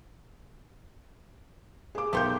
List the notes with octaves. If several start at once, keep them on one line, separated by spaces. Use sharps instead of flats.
G#4 D6
B1 A3 A#3 G4 C6 G6